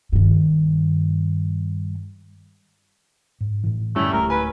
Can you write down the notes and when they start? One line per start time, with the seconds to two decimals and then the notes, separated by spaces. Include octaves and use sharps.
0.12 G2 D#3
3.40 G#2
3.64 A2 E3
3.96 G2 D3 G3 A3 C#4 E4
4.13 D1 G#3 A3 A#4
4.30 B4 G#5